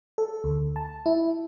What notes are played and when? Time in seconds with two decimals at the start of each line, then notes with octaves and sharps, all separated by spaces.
0.18 A4
0.44 D2
0.76 A5
1.06 E4